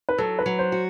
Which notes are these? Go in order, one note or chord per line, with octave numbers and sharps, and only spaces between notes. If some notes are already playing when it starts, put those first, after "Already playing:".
B4
F#3 A4
B4
F#3
C5
F#4